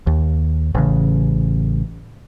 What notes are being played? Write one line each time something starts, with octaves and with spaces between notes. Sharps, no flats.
D#2
A1 C#3